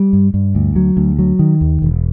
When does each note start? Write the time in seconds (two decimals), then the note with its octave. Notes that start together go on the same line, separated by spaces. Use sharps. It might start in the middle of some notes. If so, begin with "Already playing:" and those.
Already playing: G3
0.13 G2
0.34 G2
0.55 D2
0.76 F#3
0.97 D2
1.19 F#3
1.39 D#3
1.61 D#2
1.82 E1